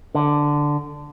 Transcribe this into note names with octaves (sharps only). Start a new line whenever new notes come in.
D3